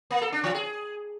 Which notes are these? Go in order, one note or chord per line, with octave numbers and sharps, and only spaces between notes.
A#3
A4
D4
E3
G#4